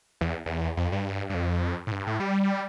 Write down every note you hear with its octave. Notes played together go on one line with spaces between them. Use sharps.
E2
E2
F2
G2
G2
F2
A2
G2
A2
G3